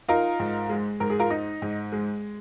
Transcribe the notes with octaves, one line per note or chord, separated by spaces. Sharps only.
D#4 F4 A#4
G#2
G#3
G#2 A#4
G#4
F4 A#4
D#4
G#2
G#3